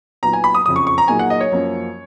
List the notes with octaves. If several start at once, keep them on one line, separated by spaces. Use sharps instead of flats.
A#2 F#3 B3 D#4 A#5
G#5
B5
D#6
F#1 F2 C#3 F3 D#6
C#6
C#6
A#5
A#2 F#3 A#3 D#4 G#4 G#5
F#5
D#5
C#5
F#2 F3 A#3